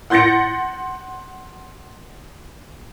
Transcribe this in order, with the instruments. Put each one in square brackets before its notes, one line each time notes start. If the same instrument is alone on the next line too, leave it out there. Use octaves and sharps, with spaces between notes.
[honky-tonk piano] F#5 C6 G6 A6 A#6 C#7